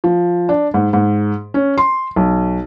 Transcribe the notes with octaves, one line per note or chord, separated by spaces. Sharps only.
F3
D4
G#2
G#2
C#4
C6
B1